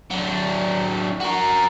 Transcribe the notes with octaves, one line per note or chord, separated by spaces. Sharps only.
F#3 D4
F#4 A#4